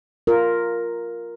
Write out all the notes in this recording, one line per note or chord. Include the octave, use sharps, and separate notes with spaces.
F4 A#4